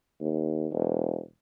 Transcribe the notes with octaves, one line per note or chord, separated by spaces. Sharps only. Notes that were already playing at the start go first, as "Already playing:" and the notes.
D#2
E1